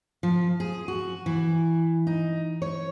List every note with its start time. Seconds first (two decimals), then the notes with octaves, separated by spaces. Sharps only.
0.23 F3
0.60 G#4
0.88 F#4
1.26 E3
2.07 D#4
2.62 C#5